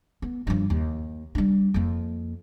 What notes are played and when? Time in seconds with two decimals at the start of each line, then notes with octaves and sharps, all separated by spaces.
0.22 B3
0.47 G2 F3
0.70 D#2
1.35 G3 D4
1.74 F2 A#3